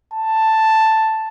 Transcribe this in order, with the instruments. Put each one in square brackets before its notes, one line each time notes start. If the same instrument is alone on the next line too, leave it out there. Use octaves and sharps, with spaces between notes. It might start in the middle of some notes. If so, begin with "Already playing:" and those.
[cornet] A5